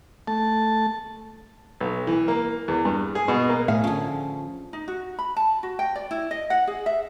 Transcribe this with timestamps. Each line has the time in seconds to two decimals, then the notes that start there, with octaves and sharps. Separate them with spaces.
0.27 A3 A5
1.81 B1
2.07 E3
2.28 A#3
2.68 E2
2.85 G2
3.15 G#4
3.28 B2
3.49 A#3
3.68 A2 G#4 E5 F5
3.84 D3 F3 C#4
4.73 D#4
4.88 F#4
5.19 B5
5.37 A5
5.63 F#4
5.79 G5
5.95 D5
6.11 E4
6.31 D#5
6.50 F#5
6.67 G#4
6.86 E5